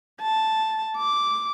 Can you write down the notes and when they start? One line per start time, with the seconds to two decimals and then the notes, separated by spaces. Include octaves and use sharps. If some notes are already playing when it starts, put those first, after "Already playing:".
0.22 A5
0.97 D6